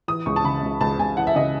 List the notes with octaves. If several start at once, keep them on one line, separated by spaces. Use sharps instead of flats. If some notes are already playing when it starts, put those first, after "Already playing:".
E3 D#6
C#2 C#6
A5
C#3 B5
C#2
C#2 A5
C#2 G#5
E3 F#5
E5
C#3 D#5